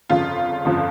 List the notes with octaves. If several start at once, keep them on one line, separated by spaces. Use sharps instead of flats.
G1 F2 C#3 F3 F4
G1 F2 C#3 F3